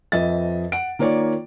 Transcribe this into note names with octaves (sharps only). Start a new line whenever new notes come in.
F2 F3 B4 D#5 E5 A6
F#5 D7
D#3 A#3 F4 C#5 D5